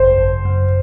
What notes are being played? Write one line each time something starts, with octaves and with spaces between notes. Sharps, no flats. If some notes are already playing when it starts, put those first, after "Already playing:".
Already playing: G#1 F#2 C#3 C5
G#1
F#2